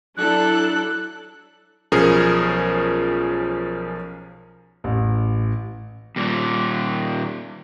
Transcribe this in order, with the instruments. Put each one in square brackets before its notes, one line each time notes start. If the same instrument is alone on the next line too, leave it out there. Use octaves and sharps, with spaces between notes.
[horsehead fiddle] F#3 E4 [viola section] D4 A4 [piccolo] F#6
[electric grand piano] B1 F3 C#4 G#4 A#4
[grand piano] A1
[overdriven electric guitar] D#2 A#2